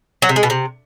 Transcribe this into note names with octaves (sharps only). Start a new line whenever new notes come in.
F#3
C3
G#3
B2
C3